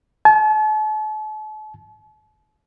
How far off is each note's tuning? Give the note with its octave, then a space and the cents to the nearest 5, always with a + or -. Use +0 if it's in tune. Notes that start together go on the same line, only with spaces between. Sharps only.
A5 -40